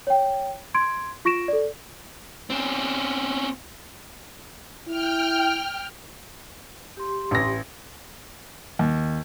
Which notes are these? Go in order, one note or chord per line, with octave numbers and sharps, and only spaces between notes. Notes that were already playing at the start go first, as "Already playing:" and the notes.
C#5 G5
C6 G#6 D7
F4 C#6 A#6 D7 E7
A4 D5
C4 C#4
E4 G5 F6
G4 C6
A1 A#6
D#2